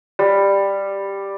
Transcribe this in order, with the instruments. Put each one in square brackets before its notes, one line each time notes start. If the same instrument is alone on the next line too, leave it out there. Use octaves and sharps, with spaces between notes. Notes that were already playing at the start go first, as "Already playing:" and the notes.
[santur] G3